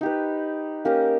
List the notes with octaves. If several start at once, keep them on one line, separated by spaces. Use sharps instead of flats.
D#4 G4 B4
A#3 C#4 G4 A#4